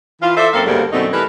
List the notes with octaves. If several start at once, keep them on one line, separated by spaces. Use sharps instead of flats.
E3 F4
A4 C5 D5 E5
F#2 A#3 C4 A4 A#4 F5
D2 G2 C#3 G3 A#3 B3
F#2 B2 D3 A3 C4 D#4
E3 G3 A3 A#4 B4